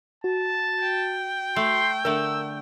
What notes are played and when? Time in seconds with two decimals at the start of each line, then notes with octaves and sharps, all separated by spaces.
0.24 F#4 A5
0.82 G5
1.56 A3 C6
2.05 D3 A3 A#4 E6